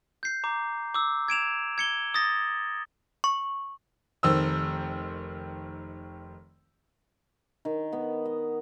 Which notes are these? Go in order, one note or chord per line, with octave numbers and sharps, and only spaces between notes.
G6 C7
A#5 D6
D6 E6
G#6 D7 E7 F7
G#6 C#7 G7
D#6 A6 A#6
C#6
F1 D#3 C5 E6
D#3
B3
D#5